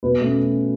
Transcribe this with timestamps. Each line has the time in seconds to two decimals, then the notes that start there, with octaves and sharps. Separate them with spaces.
0.03 B2 B4
0.20 A3 C#4